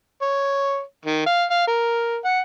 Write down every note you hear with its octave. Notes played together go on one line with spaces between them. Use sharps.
C#5
D#3
F5
F5
A#4
F#5